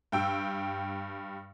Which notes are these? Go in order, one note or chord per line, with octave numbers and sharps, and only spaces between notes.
G2 G5 E6